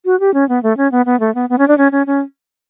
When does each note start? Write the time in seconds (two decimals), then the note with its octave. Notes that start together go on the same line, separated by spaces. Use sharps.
0.05 F#4
0.20 G4
0.34 C#4
0.49 B3
0.63 A3
0.77 C#4
0.92 B3
1.06 B3
1.20 A3
1.35 B3
1.49 B3
1.58 C#4
1.68 D4
1.78 C#4
1.92 C#4
2.07 C#4